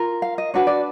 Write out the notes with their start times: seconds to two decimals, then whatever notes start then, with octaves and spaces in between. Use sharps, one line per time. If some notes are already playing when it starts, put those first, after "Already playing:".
Already playing: F4 A#4
0.22 F5
0.38 D#5
0.54 D4 F#4 B4 C#5
0.67 D5